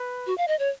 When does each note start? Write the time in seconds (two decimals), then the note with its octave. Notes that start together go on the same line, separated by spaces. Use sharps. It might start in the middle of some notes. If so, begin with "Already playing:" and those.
Already playing: B4
0.26 F#4
0.38 F5
0.48 D#5
0.59 C#5